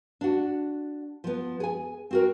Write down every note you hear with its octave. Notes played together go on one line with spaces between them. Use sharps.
D4 F#4
F3 B3
G#4 G#5
C4 F#4 A#4